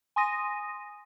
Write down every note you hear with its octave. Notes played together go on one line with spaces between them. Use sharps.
G#5 C6 D#6 A#6 D#7